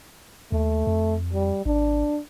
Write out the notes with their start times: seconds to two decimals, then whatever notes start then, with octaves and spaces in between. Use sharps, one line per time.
0.52 D#2 A3
0.87 F2
1.33 G3
1.66 G#1 D4